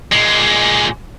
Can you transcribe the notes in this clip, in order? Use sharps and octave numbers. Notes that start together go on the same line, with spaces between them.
A#2 G#3